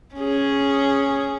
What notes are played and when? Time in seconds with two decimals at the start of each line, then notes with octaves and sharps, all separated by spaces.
0.15 C#4 G#4